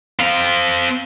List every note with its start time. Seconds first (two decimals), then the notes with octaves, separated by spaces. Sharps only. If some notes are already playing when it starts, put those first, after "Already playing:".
0.19 C4 F5